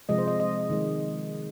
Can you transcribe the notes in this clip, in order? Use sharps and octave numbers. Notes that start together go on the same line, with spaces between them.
C3 F3 G#3 D#5
C5
D#5
D#5
D#3 G#3